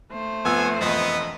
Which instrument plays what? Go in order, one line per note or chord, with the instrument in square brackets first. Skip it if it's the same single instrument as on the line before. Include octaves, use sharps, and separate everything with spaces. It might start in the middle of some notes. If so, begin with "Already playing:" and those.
[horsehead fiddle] A3 C5
[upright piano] F2 E6 [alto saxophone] B3 [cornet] G#5
[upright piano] E1 F2 [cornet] B3 [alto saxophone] D#5